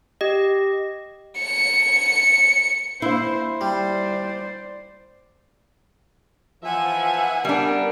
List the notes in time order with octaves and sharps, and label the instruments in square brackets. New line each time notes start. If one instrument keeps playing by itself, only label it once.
[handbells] G4 D#5
[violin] C#7
[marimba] A#3 D4 F5 [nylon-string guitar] E4 [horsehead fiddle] C5
[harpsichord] G3 [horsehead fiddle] C5 D5
[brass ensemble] E3 F3 [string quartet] E5 F#5 G#5
[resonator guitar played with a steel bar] G3 D4 [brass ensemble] B3 A#4